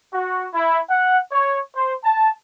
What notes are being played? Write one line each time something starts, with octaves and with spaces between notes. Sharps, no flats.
F#4
E4
F#5
C#5
C5
A5